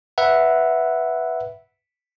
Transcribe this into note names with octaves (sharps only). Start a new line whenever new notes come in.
B4 E5 F#5